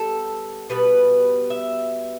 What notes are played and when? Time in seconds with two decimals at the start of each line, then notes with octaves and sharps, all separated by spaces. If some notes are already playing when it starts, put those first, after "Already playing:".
Already playing: G3 B3 A4
0.70 B2 G3 B3 B4
1.50 E5